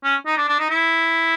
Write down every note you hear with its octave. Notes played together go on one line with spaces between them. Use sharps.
C#4
D#4
D4
D4
D#4
E4